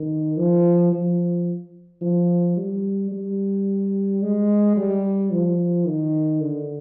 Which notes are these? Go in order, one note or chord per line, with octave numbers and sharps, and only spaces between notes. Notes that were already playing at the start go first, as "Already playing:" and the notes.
Already playing: D#3
F3
F3
F3
G3
G3
G#3
G3
F3
D#3
D3